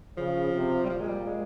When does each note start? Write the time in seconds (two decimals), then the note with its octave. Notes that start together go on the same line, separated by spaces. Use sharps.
0.17 C#3 F3
0.53 C3
0.84 G3
0.89 A#2 F3
1.00 G#3
1.08 G3
1.26 G#3